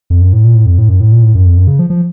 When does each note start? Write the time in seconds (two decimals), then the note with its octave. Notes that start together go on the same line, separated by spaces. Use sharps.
0.10 F2
0.21 F#2
0.33 A2
0.44 A#2
0.55 A2
0.66 F2
0.78 A2
0.89 F#2
1.00 A2
1.12 A#2
1.23 A2
1.35 F#2
1.46 F2
1.57 F#2
1.67 C#3
1.79 F3
1.90 F3